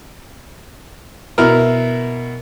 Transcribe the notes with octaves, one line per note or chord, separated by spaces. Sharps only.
B2 E4 A#4 F6